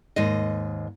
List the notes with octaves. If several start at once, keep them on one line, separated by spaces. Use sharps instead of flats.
D#2 G#2 D#5